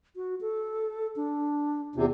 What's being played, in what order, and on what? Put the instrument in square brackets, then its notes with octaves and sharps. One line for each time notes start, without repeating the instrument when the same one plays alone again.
[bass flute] F#4
A4
D4
[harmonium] E2 C3 [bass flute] F4